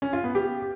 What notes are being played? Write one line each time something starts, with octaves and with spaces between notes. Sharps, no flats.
C#4
F4
B3
G4